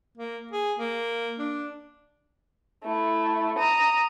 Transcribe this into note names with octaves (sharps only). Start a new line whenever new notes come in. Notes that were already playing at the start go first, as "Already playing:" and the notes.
A#3
G#4
A#3
D4
A3 E4
A#5 D#6